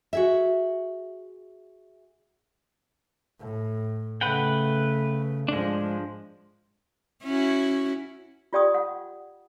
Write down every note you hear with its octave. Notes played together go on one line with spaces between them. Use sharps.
F#4 G#4 E5
A2
C#3 A3 B4 F#5 G5
G#2 F3 G#3 D4
C#4 E4 F#4
F4 G4 D5 G5 C#6 D#6
F#5